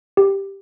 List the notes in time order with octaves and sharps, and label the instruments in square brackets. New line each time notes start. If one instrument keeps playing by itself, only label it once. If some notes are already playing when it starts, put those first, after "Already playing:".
[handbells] G4